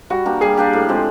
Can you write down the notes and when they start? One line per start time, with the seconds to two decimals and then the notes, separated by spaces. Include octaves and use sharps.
0.10 G3 F#4
0.26 A#3 D4 G4
0.41 G3 G#4
0.57 A#3 D4 G4
0.73 A2
0.88 F3 G#3 C4